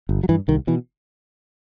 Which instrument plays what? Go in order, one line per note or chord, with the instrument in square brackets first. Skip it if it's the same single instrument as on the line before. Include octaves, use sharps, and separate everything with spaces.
[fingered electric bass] G1
F#3
G2 E3
C2 D#3
B2 E3